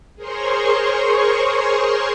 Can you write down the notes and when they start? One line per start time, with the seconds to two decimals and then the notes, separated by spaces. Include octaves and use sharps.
0.16 G#4 A#4 C5 C#5 C6 C#6